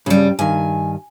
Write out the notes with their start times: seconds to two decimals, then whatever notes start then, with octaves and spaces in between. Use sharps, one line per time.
0.06 G2 C#3 G3
0.39 G2 D#3 G#5